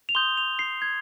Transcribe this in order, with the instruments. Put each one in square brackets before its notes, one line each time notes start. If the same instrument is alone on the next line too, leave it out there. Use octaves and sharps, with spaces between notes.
[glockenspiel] F7
C6 D#6 G6 G7
F7
C7
G#6